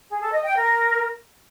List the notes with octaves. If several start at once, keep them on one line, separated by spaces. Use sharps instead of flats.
G#4
A4
D#5
G5
A#4